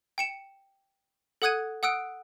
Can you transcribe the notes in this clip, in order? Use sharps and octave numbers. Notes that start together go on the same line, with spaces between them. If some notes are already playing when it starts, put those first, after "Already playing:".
G5 C#7 E7
A4 F#5 D#6 F#6 G#6 D#7
F#5 D#6 E6 F#6 D7